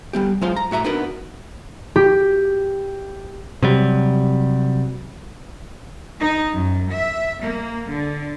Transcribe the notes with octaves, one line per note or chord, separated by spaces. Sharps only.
G3 B3 G4
F#3 G#3 F4 C5 F5 C6
A#5
A2 F#4 E5 A#5
B3 D4 D#4 F#4 A#4 B4
G4
C3 F#3 G3
D#4
F#2
E5
A#3
D3